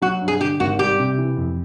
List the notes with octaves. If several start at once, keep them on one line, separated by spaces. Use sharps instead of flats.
F#3 F#4
G2
G#4
D3 G4
G#1 F#4
G3 G4
C3
E3
F2